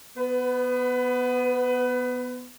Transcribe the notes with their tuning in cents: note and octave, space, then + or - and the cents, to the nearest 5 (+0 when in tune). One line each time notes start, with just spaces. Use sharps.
B3 +0 B4 +30